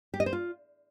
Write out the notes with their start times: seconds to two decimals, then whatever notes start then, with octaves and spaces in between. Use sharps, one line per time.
0.14 G4
0.20 D#5
0.26 C5
0.33 F4